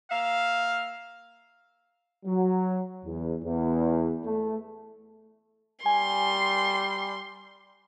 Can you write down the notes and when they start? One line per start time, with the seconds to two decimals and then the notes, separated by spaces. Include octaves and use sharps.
0.11 A#3 E5 F5
2.25 F#3
3.04 E2
3.42 E2
4.24 A3
5.86 G3 G#5 C6